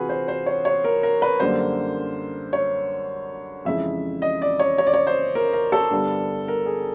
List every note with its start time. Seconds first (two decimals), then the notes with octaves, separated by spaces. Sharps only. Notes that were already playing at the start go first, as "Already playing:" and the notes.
Already playing: D2 C3 E3 F4 F#4 G#4 B4
0.09 C5
0.28 C5
0.46 C#5
0.65 C#5
0.84 A#4
1.03 A#4
1.22 B4
1.40 F#2 D3 G3 A#3 C5
2.53 C#5
3.65 F2 C#3 E3 G#3 E5
4.22 D#5
4.42 D5
4.59 C#5
4.78 C#5
4.87 D5
4.94 C#5
5.07 C5
5.35 A#4
5.53 A#4
5.72 A4
5.91 G2 D3 G3 B3
6.48 A#4
6.66 G#4